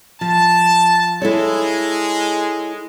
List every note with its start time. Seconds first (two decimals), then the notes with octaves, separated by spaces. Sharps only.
0.21 F3 A5
1.22 G#3 E4 A4 C#5